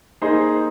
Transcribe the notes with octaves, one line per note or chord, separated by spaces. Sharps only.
A#3 D#4 G#4 C5
C5